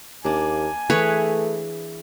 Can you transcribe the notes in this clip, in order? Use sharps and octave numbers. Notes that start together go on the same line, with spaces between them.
D#2 A#3 D4 G#5
E3 A3 G#4 B4 C#5